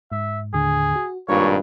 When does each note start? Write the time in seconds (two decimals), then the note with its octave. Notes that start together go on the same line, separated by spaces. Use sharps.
0.12 G#2 E5
0.54 D#2 A2 D3 G#4
0.96 F#4
1.28 G#1 G2 A#2 C#5 F5 A#5